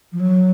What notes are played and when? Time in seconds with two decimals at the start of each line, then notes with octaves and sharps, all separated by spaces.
0.12 F3
0.19 F#3